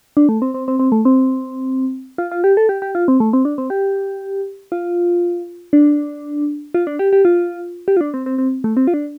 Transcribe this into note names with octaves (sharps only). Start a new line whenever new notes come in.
D4
A3
C4
C4
C4
C4
A3
C4
F4
F4
G4
A4
G4
G4
F4
C4
A3
C4
D4
C4
G4
F4
D4
F4
D4
G4
G4
F4
G4
F4
D4
C4
C4
C4
A3
C4
F4
D4